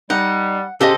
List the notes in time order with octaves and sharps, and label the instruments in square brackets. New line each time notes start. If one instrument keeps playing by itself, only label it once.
[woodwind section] G3 [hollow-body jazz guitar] D#4 [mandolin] F#5
[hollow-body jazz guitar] C#3 G4 [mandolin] A4 C5 D#5